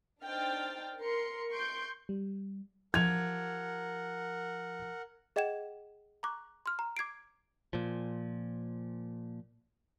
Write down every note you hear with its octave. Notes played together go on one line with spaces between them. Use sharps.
D4 D#4 C5 G5 F6 A6
A#4 C6 C#7
C6 C#6 G6 D7
G3
F3 G4 A#4 F#5 G#6 F7
G#4 D#5 F#5 G5 G#6 E7
A#5 C#6 D6 F#6
C6 F6
A#5
D6 G#6 C7 D7
A#2 F3